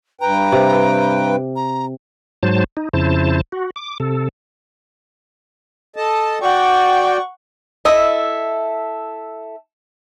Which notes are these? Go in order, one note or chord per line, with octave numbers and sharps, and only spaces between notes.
G2 B4 G5 A#5
C3
A#5
G#2 F#3 C5 A5
D#4
F2 C#3 E4 C5 A5
F#4
D6
C3 A4
A4 D#5 A5
F#4 D5 F#5 G5 C#6
E4 A4 D#5 E5